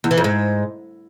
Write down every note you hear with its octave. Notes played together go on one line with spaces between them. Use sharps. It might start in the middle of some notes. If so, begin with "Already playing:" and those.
E2
E3
F2
G#2